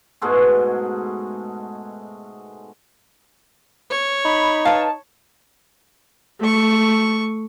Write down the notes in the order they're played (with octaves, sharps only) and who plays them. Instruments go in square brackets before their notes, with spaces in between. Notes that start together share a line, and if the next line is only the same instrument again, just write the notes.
[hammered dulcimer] G#2 B2 G#3 A3
[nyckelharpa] C#5
[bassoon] D#4 [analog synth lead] B5
[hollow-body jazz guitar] B4 F5 [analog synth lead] A5
[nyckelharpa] A3 C#6